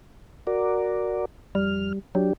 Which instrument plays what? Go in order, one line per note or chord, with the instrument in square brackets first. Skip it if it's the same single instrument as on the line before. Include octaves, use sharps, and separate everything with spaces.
[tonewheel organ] F#4 A#4 D5
[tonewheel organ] F2 F6 [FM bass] G3
[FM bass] F#3 [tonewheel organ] D4 G4